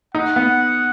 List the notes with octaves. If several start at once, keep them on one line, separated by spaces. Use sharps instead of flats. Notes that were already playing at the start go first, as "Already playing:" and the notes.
D#4 F#5
B3